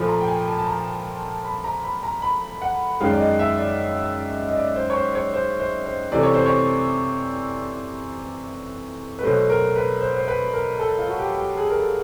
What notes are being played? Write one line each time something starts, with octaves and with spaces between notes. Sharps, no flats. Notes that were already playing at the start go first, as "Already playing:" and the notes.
Already playing: A#2 F3 A3 B5
A#5
G5
G#5
A5
A5
A#5
B5
A#5
B5
A#5
B5
F#5
F#2 D#3 G#3 F5
D5
D#5
E5
D5
D#5
D5
C5
C#5
C5
C#5
C5
C5
C5
C3 E3 A3 D5
C#5
C5
C#5
B4
B2 F#3 A3 C5
A#4
B4
C5
C5
B4
A#4
A4
F4
F#4
G4
G4
G#4
A#4
A4